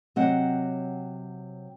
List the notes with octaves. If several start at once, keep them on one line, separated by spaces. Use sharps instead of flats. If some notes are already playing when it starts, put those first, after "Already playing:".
C3 F#3 C4 C#5 D#5 F#5